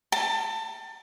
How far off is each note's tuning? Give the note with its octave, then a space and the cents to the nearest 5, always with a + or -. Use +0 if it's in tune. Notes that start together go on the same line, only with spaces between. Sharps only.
A5 +25